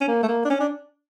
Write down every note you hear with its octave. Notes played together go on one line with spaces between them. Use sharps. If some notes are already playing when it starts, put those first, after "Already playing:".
C#4
A#3
A3
A#3
D4
C#4
D4